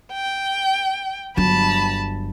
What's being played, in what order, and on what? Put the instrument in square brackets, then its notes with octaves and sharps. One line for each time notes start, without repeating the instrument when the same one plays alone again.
[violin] G5
[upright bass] G1 F#3 [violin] A5 B5